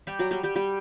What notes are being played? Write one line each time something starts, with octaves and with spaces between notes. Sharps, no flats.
G3 G4
F#3 F#4
G3 G4
G3 G4
G3 G4